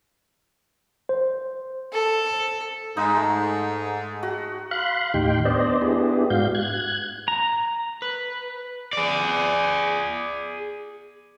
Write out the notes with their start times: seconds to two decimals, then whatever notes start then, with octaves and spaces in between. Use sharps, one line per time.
1.09 C5
1.93 A4
2.97 G#2 D#4
3.17 A3
4.23 F#4
4.71 F5 B5 C6 F#6
5.14 D#2 A2 D#4 G4 G5 C6
5.45 B3 D4 C5 D5 D#5
5.82 B3 D4 E4 G4 G#4
6.30 G#2 F#4 F5 G6
6.55 F#6 G#6
7.28 A#5
8.02 B4
8.93 G#4 D5